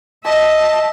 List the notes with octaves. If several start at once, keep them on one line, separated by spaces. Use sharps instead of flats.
D#5 E5 A5